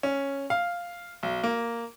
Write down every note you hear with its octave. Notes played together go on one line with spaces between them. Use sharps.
C#4
F5
B1
A#3